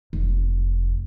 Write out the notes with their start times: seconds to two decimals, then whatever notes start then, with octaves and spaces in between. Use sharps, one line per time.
0.13 F1